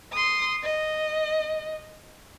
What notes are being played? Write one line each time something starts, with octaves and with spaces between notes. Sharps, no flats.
C6 D#6
D#5